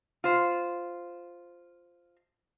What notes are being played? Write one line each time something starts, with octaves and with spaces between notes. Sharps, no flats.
F4 C5